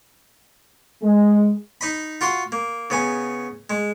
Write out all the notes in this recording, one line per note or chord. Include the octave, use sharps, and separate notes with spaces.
G#3
D#4 D#5 B5
F4 F#4 F#5 C6
A#3
C#3 B3 G#5
G#3